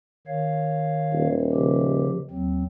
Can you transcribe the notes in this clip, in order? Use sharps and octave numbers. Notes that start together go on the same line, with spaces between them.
D#3 C#5 F5
D#1
C#3 F3 G4
D#2 F#3 C4